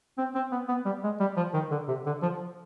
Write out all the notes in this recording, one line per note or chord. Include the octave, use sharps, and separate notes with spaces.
C4
C4
B3
B3
G3
G#3
G3
F3
D#3
D3
C3
D3
F3